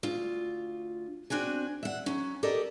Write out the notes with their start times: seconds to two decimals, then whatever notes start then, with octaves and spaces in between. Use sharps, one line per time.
0.03 D2 F4
1.30 C4 D4 F#4 G#5
1.83 E5 F#5
2.06 F#3 C#4
2.43 G4 A4 A#4 D5 D#5